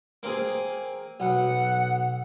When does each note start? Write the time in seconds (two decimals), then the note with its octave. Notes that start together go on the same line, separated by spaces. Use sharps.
0.23 A#3 C4 G#4
1.20 B1 F#5